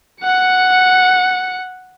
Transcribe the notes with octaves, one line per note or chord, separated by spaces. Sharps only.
F#5 C#7